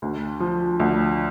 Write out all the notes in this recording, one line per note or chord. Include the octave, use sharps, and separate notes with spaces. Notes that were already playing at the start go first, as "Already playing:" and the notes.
D2
F3
D2